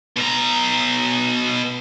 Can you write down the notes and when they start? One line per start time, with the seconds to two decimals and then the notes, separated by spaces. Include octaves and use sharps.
0.17 B2 A#5